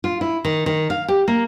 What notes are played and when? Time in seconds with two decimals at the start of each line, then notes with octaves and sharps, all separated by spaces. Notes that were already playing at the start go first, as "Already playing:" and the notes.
0.04 F4
0.21 E4
0.45 D#3
0.66 D#3
0.90 F5
1.08 G4
1.28 A#3